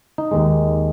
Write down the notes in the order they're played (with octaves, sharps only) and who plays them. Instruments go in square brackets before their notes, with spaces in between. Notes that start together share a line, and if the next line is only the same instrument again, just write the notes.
[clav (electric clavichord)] D#4
D#2 D#3 G#3